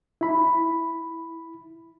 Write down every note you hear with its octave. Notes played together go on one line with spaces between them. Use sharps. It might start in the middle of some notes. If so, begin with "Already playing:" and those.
E4 B5